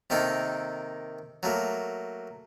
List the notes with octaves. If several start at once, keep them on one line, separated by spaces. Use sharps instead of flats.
C3 D#3 A#3 D#4 A4
F#3 A3 A#3